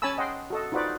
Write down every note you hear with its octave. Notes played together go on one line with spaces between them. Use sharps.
C#4 C#5 G#5 A5 B5 E6
D#5 F#5 G5 C6
F#4 A4 D#5
D#4 F4 F#4 B4 C5 D5